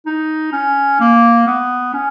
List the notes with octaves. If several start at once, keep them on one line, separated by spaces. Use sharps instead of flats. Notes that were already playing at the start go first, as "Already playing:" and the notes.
D#4
C#4
A#3
B3
C#4